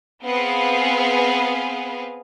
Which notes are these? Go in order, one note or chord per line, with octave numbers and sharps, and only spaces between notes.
B3 C4 G#4 B4 F5